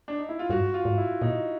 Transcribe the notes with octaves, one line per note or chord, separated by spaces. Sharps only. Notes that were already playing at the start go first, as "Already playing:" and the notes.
D4
D#4
E4
F4
G2 F#4
F4
G#2
E4
A#2 D#4